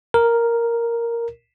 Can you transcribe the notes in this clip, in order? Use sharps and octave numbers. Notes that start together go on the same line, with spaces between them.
A#4